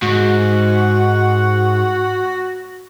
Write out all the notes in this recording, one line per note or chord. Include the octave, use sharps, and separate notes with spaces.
G#2 F#4